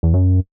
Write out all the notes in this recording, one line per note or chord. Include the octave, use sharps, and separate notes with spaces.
E2
F#2